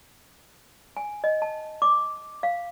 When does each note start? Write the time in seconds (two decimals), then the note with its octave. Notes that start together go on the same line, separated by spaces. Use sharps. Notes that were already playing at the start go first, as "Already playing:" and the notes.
0.97 G#5
1.24 D#5
1.42 A5
1.82 D6
2.43 F5